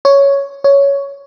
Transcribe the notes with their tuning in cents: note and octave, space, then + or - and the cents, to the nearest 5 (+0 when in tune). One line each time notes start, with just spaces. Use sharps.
C#5 +5
C#5 +10